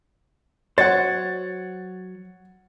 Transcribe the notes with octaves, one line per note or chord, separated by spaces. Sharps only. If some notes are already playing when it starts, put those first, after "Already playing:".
F#3 C5 C#5 F#5 A6